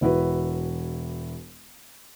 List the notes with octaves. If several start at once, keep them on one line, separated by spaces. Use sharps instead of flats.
E1 E4 F#4 B4